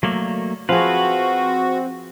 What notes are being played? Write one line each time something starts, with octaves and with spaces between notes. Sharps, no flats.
F#3 A3 A#3 D5
F3 C4 F#4 G#4 B4 F5